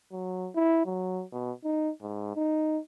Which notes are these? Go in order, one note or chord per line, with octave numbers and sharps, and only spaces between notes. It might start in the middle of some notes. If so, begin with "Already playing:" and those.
F#3
E4
F#3
B2
D#4
G#2
D#4